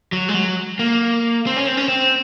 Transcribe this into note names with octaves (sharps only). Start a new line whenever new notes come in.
F#3
G#3
F#3
A#3
C4
C#4
C4
C#4
C4